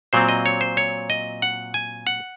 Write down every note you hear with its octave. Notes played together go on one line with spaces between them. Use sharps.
A#2 F#3 C4 C5
D#5
C#5
C5
C#5
D#5
F#5
G#5
F#5